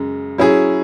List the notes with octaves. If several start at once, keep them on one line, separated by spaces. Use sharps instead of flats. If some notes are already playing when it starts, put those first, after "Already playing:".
Already playing: F#2 C#3 G#3
F#3 C#4 E4 G#4